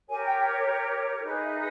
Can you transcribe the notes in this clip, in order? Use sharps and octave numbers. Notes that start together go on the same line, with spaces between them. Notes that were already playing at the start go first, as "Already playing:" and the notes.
G4 A#4 C#5 G#5
G5
G5
D#4 G#4 B4
E5